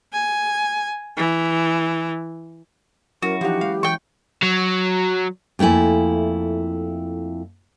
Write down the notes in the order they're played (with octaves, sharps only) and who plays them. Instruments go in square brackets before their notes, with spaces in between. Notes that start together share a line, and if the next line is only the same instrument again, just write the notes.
[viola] G#5
E3
[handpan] F#3 C#4 E4 [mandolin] F#4 [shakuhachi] A#4
[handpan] E3 E4 F#5 [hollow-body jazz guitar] F3 D#4 [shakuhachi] G4
[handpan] G#3 [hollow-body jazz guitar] F5
[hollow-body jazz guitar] E3 [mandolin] G5 C#6
[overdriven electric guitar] F#3
[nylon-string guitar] F2 A3 A#3 E4 G#5